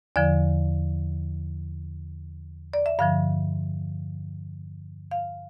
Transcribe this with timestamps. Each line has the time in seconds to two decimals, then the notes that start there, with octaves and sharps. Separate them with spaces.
0.16 E2 D3 F3 D5
2.73 D5
2.86 E5
2.99 G2 D3 F3 F5
5.11 F5